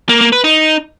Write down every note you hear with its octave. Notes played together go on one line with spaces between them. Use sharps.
A#3
A#3
B4
D#4